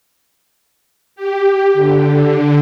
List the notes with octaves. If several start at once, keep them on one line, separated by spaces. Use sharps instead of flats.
G4
D3